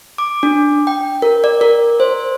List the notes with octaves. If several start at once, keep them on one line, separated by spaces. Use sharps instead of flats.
D6
D4
G5
A#4
D5
A#4
C5